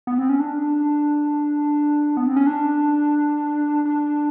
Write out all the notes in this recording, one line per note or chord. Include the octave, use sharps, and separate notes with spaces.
B3
C4
C#4
D4
B3
C4
C#4
D4
D4